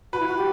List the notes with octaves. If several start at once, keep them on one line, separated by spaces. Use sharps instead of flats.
F#4 B4
E4
F#4
G4